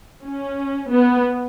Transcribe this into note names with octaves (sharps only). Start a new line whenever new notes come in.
C#4
B3